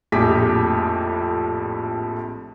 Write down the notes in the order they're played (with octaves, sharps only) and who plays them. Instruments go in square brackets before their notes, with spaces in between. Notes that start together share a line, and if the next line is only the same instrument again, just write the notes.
[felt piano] A#1 F2 A2 G4 G#4 B6